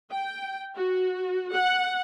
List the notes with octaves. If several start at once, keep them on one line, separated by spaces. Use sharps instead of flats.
G5
F#4
F#5